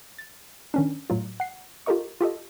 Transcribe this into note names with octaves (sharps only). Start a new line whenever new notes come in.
A6
D#3 C#4 D4
A2 F#3 F4
F#5 C7
F4 G4 A4 A#4 D#5 C#6
F4 G4 A4 D#5